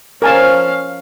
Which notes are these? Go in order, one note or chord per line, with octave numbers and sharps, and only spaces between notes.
F3 C#4 A#4 F5 G#5 A5